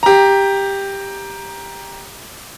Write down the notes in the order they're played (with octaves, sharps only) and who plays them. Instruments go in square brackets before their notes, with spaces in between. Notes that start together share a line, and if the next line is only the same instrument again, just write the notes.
[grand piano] G4 A#5